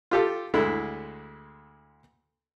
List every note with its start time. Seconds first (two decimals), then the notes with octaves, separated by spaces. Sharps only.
0.11 F4 G4 A4
0.54 D2 D3 G#3 E4